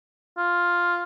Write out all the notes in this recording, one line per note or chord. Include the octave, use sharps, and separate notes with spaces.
F4